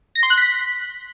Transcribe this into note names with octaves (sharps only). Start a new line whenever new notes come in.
A#6
C6
F#6
B6